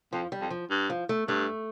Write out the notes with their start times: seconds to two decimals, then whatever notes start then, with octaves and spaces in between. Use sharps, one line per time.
0.13 F2 F3
0.32 G3
0.41 F2
0.51 F3
0.70 G2
0.90 F3
1.09 A3
1.28 G2 A3